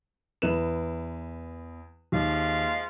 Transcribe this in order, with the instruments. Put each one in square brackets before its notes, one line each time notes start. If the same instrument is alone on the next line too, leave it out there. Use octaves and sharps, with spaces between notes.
[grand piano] E2 B4 E7
[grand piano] D#2 [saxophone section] F3 G#3 F5